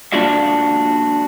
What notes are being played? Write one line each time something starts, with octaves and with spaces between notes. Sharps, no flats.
A#3 D4 F4 F#4 E5 F5